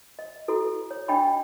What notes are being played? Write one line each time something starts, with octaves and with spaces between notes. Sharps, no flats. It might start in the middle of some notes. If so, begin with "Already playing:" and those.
D#5
E4 F#4 A4
C#5
D4 D#5 G5 B5 C#6